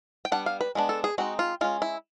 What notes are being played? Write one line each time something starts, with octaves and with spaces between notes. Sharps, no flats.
G5
G3 B3 D4 F#5
F5
B4
G#3 B3 D4
A4
G#4
G#3 C4 D#4 F#4
F4
G#3 C#4 F4
E4